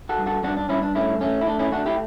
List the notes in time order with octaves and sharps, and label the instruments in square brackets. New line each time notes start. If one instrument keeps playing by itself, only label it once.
[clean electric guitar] F#4 A4
G2
F#4 A4
G2 D4 F#4
D4
G2 C#4 E4
D4
A3 C#4 E4
A3 C#4
E4
A3 D4
C#4 E4
A3 D4 F#4
E4 G4